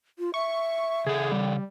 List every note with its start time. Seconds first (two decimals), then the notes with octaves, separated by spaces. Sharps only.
0.19 F4
0.34 E5 C#6
1.07 C#3 G#4 A4
1.32 G3